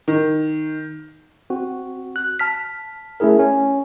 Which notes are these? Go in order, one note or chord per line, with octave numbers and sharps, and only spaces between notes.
D#3
C4 F#4
F#6
A5 F6 B6
A3 C#4 E4 G#4 A#4
C#4